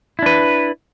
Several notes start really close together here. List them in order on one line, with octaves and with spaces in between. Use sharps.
E4 D4 B4